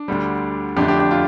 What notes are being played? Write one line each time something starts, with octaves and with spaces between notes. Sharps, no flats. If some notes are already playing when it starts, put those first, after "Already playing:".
Already playing: D4
D2 D3 G3
F2 D3 A3 D4 G4
D4 G4
D4 G4
F4